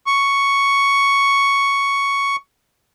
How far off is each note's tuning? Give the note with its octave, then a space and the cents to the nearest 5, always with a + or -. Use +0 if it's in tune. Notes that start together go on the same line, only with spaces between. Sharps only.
C#6 +5